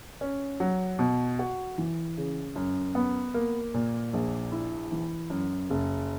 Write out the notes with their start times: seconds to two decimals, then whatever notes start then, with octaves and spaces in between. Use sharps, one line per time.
0.21 C#4
0.60 F#3
0.99 B2
1.39 F#4
1.78 E3
2.18 C#3
2.56 F#2
2.95 B3
3.34 A#3
3.74 A#2
4.14 A#1
4.52 E4
4.92 E3
5.30 F#2
5.70 F#1